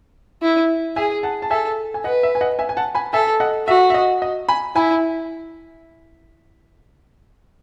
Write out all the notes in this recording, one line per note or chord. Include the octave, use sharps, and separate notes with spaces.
E4
G#4 E5 G#5
F#5 A5
A5
A4 E5 G#5
G#5
B4 D#5 F#5
E5
G#5
D#5 F#5
E5 G#5
G#5
F#5 A5
G#5 B5
A4 E5 G#5
D#5 F#5
F#4 E5
E5
D#5
D#5
G#5 B5
E4 G#5 B5